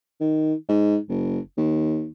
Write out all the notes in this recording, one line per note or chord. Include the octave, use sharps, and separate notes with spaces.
D#3
G#2
F#1
D#2